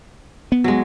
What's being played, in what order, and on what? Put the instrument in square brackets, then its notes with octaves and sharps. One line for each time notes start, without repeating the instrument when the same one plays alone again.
[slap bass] B3
[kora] F#3 G#3